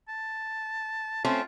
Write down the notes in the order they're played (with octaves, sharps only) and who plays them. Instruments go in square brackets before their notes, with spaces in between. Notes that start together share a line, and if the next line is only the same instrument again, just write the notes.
[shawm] A5
[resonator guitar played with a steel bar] A3 C4 C#4 [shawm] F4